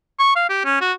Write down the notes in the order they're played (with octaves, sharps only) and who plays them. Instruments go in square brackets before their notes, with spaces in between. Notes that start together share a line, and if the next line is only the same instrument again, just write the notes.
[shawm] C#6
F5
G4
C#4
F#4